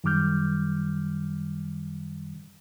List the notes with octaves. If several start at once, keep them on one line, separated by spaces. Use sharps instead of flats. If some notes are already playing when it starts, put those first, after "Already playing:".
F#2 D#3 G3 D6 F6 G6